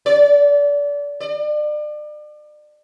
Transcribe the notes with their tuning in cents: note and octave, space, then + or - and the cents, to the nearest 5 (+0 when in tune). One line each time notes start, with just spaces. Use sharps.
D5 -25
D5 +35